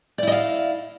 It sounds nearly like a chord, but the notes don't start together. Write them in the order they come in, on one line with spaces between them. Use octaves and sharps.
D5 E4 D#5 F5